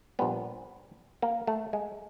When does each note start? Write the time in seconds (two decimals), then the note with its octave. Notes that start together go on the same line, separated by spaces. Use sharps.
0.19 A#1 A#2 G3 B3
1.22 A#3
1.47 A3
1.73 G#3